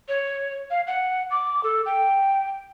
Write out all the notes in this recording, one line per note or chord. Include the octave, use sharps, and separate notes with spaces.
C#5
F5
F#5
D6
A4
G5